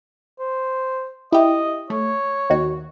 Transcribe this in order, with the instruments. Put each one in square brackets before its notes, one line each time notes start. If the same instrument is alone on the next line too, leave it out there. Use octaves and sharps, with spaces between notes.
[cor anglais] C5
[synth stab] E4 G4 [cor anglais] D#5
[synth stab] A3 [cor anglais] C#5
[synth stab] D#2 D#3 F#4